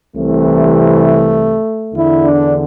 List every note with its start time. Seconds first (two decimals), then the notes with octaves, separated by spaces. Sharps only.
0.16 C2 C3 E3 A3
1.94 E2 D3 E4
2.23 D4